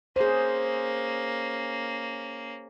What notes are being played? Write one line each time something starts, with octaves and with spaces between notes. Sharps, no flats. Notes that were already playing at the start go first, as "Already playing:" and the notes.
A#3 C#4 G#4 C5